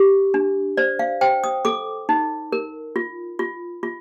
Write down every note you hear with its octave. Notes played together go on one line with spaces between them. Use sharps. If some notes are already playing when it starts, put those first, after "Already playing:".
Already playing: G4
D4
C5 D5
F5
C5 G5
D#6
A4 D6
D#4
A#4
F4
F4
F4